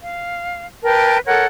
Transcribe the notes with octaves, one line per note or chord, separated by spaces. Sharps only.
F5
A#4 B4 G5 A5
A4 A#4 C#5 F#5